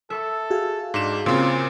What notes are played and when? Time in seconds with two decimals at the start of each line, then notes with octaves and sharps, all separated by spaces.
0.10 A4 E5 C#6 E6
0.50 F#4 G#4 F5
0.94 G#2 D4 E7
1.26 A#2 C#3 C4 F4